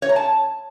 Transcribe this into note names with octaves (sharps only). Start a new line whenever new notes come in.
C#5
A#5
A5